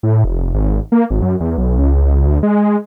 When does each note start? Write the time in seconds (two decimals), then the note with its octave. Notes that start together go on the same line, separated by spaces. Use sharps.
0.03 A2
0.24 F1
0.54 G#1
0.92 A#3
1.10 G#1
1.22 F#2
1.40 E2
1.58 B1
1.78 C#2
2.26 D2
2.43 G#3